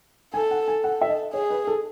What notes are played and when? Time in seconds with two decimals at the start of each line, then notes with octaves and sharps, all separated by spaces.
0.34 A4 G#5
0.51 F#5
0.68 G#5
0.84 A4 F#5
1.01 E5
1.09 D#5
1.34 G#4 C#5
1.50 B4
1.67 A4